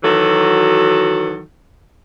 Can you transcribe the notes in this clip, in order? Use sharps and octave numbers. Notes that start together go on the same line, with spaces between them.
D#3 E3 F#3 F#4 A4